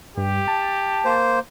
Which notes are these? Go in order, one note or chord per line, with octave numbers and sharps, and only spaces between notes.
G2 G4
A5
A#3 C5